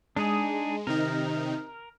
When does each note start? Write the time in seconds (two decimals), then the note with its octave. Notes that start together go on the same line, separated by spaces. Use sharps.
0.16 G#3 D4 D#4 G#4
0.87 C3 D#3 D#4 A#4